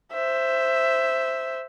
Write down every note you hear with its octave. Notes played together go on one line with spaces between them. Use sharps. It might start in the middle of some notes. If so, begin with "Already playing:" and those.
C5 E5